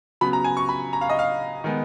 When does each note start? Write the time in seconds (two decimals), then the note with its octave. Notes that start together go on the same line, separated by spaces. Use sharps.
0.21 C#3 F#3 B3 B5
0.33 A#5
0.44 G#5
0.57 C#6
0.69 B5
0.93 A#5
1.01 F5
1.10 D#5
1.19 F5
1.64 D#3 G#3 B3